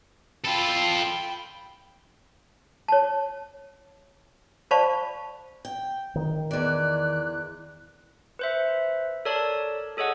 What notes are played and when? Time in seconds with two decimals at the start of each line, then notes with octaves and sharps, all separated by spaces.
0.45 F4 A4 G5 B5
2.88 C#5 A5
4.71 C5 D5 F5 A5 B5 C#6
5.65 G5
6.16 D#3
6.51 E2 D5 F#6
8.39 B4 C5 E5
9.25 A4 A#4 C#5 D5 A5
9.97 G#4 A4 C#5 D#5 F#5